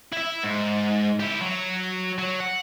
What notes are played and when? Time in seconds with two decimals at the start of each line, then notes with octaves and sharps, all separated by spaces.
0.13 E4 E5
0.43 G#2
1.20 E4 G4
1.41 F#3
2.18 F#3
2.40 F#5